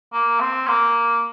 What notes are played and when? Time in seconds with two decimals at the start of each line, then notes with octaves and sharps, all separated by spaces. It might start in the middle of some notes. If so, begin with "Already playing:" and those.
0.13 A#3
0.40 C4
0.68 A#3